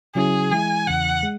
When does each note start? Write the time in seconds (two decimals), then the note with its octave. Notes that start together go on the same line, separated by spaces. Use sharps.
0.15 C#3 F#3 C#4 E4 G#4
0.51 E3 G#3 E4 G#5
0.87 E2 C#3 E3 F#5
1.23 G#3